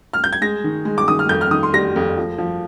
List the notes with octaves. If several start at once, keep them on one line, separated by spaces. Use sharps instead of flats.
F6
G6
G#6
G#3 A#6
D#3
G#3
D6
D#3 D#6
F6
F2 G6
F6
D#3 D#6
C6
G3 A#6
F2
F3
F3